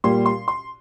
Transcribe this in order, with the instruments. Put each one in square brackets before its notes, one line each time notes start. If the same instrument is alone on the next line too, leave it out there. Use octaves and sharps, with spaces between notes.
[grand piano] A#2 G3 C6
C6
C6